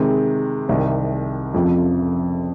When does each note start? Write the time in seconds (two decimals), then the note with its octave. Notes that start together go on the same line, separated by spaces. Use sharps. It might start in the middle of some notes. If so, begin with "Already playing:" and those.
Already playing: C3 D#3 G#3
0.69 C2 C3 D#3
1.54 F1 F2 C#3 F3 C4